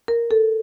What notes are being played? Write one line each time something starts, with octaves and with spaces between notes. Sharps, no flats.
A#4
A4